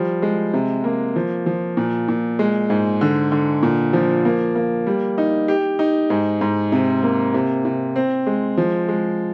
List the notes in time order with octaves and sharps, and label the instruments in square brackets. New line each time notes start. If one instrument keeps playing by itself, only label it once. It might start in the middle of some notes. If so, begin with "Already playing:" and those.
Already playing: [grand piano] F3 G3
G#3
C3
A#3
F3
F3
A#2
A#2
G#3
G#2
D3
D3
A#2
F3
A#3
A#3
G3
D#4
G4
D#4
G#2
G#2
C3
A#3
C3
C3
C4
G#3
F3
G#3